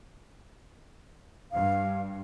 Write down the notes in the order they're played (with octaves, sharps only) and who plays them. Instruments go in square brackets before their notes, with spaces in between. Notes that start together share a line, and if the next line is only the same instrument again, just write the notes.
[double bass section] G2 [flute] F5